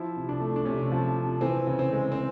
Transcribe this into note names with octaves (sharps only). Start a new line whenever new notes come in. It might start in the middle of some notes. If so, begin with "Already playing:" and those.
Already playing: F3 E4
C3
D4
A3
D4
C3 C#4
F3
C3
E3 C4
C#3
C4
G#3
C4